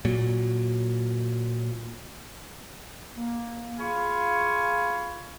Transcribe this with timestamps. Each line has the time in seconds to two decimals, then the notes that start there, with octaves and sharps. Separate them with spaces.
0.05 A#2 F#3
3.16 A#3
3.78 F4 G#4 F5 G#5 B5 C#6